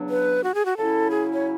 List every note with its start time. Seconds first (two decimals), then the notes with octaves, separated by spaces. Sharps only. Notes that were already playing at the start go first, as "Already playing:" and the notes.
Already playing: E2 C#3 F#3 B3 D4
0.10 B4
0.44 F#4
0.55 G#4
0.65 F#4
0.77 C#3 F#3 C#4 E4 A4
1.11 G#4
1.33 C#5